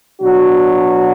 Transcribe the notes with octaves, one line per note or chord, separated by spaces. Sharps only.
B2 F#3 D4 F#4